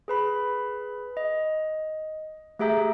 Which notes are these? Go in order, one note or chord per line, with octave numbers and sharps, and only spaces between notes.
G#4 B4 B5
D#5
A3 G4 G#4 E5 A#5 G6